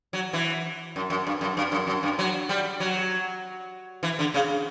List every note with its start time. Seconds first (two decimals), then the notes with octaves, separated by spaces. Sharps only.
0.13 F#3
0.33 E3
0.96 F#2
1.10 F#2
1.27 G2
1.41 F#2
1.57 G2
1.72 F#2
1.87 F#2
2.03 G2
2.19 F#3
2.49 G3
2.80 F#3
4.03 E3
4.19 D3
4.34 C#3